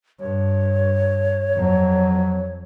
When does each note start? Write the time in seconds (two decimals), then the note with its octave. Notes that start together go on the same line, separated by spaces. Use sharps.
0.20 G2 C#5
1.56 F2 F#3